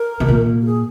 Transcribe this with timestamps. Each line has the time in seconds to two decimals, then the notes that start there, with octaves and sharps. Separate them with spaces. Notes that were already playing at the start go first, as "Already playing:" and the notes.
Already playing: A#4
0.20 B2
0.28 A#2
0.61 F#4
0.66 G#4